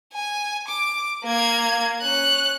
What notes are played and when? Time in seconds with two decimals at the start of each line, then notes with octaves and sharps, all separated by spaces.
0.13 G#5
0.68 D6
1.24 A#3 G#6
2.02 C#4 F#6